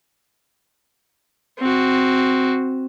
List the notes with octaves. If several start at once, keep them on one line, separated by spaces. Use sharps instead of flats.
C4 F#4